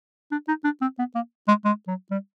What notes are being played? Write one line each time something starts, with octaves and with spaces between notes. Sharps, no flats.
D4
D#4
D4
C4
B3
A#3
G#3
G#3
F#3
G3